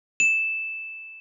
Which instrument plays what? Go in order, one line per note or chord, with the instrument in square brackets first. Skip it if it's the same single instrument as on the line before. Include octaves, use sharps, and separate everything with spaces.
[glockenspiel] E7